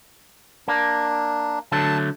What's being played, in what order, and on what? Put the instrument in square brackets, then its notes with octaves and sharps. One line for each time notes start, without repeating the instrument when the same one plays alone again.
[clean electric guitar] A#3 [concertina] D4
[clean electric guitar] D3 F#3 A3 [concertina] A5